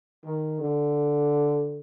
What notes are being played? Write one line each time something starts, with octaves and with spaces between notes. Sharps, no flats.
D#3
D3